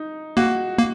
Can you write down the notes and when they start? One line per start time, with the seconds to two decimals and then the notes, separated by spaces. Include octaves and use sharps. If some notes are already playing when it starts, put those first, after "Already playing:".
Already playing: D#4
0.37 A#3 F#4
0.78 A#3